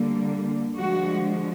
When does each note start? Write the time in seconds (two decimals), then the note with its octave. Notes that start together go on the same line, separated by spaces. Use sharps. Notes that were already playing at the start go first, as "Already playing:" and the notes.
Already playing: D3 G3 A#3
0.79 D3 F3 G#3 F#4